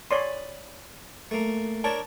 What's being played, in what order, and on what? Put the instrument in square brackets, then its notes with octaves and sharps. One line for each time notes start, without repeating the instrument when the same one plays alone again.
[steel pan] C#5 D5 C6 [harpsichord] B5 D#6
[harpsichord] A3 A#3
[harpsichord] D4 A#4 C#5 [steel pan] A5